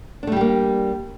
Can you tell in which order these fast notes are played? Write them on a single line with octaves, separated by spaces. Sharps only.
D4 A3 G3 G4 A#3